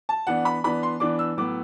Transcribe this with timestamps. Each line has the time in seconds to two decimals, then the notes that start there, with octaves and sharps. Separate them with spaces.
0.09 A5
0.27 E3 B3 D4 F#5
0.45 B5
0.64 E3 B3 D4 B5
0.83 C6
1.00 E3 B3 D4 D6
1.19 E6
1.37 A2 F#3 B3 D6